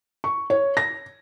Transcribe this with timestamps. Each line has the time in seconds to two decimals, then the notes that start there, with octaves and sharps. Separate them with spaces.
0.24 C#6
0.50 C#5
0.77 A#6